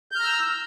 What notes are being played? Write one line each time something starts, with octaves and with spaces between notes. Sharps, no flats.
A#5 E6 F6 G6